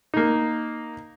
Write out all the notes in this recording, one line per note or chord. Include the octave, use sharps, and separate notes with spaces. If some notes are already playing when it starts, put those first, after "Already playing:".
A#3 D#4